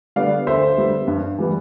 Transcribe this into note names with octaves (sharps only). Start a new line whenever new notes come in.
D3 G3 B3 D5 F5
D2 C5 E5
D3 G3 B3
G2
E3 G3 B3